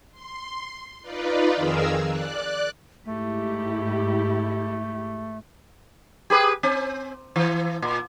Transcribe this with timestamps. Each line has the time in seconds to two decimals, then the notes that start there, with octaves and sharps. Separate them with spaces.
0.12 C6
1.02 D#4 F4 B4 D5
1.55 F2 D#3 G#4 A#4 F5 E6
2.08 D5 F#6
3.05 G#2 A3 E4 G4
6.30 G4 G#4 B4
6.63 C4
7.36 E3
7.82 A#2